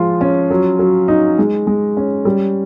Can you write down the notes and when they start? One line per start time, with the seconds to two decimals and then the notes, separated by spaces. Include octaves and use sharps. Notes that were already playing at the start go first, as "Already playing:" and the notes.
Already playing: F3 G#3 F4
0.21 C#4
0.50 F#3
0.79 F#3
1.08 D#4
1.39 G#3
1.67 G#3
1.97 C#4
2.25 G3